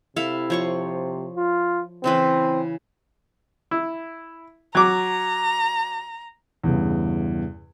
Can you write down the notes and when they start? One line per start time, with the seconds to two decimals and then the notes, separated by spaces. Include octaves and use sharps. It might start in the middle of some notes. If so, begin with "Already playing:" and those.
0.16 C3 E4 A4 F5
0.50 F3 C#5 C#6
1.37 F4
2.04 C#3 E3 C4 B4
3.71 E4
4.75 F#3 A#5 D6
6.64 E2 G2 C#3